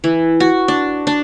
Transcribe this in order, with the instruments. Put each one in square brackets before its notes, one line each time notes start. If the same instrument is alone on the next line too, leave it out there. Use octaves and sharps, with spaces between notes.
[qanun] E3
F#4
D4
D4